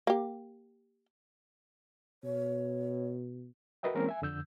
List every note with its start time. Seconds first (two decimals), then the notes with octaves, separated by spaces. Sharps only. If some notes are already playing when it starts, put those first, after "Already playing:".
0.07 A#3 G4
2.24 B2 C#5
3.83 F#4 A#4 B4 D#5 E5 G5
3.94 E3 G#3 A#3 C4 C#4 A#4
4.09 E5 G#5
4.22 F2 D3 E6 G6